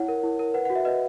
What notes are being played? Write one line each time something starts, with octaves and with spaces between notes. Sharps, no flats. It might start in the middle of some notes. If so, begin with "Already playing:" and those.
Already playing: E4 C#5 F#5
A#4
E4
A#4
B4 F#5
F#4 F#5
E5
B4 D#5